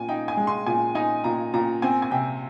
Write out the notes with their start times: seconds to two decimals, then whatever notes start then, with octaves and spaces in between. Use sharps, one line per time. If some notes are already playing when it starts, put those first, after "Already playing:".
Already playing: A#2 G#5
0.09 D#4 G5
0.28 G#5
0.37 G#3
0.47 C6
0.66 A#2 G#5
0.95 D#4 G#5
1.24 A#2 A#5
1.54 A#2 A#5
1.82 C4 G#5
2.02 G#5
2.11 C3 G5